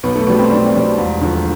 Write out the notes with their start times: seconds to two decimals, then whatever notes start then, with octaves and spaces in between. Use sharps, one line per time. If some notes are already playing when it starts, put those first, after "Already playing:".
0.03 B1 B3
0.16 A3
0.27 B2 G3 B3
0.39 C4
0.50 B1 D4
0.66 C4
0.74 B2 G3
0.98 E1
1.21 D2 D3 F3